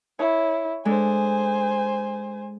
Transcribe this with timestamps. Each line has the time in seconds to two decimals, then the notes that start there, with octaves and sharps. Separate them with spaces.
0.19 E4 C#5
0.85 G#3 D4 A4 C5 G#5